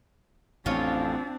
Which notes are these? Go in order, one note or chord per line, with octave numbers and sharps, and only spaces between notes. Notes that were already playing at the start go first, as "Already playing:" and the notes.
A1 F2 C4 D4 F4 C#5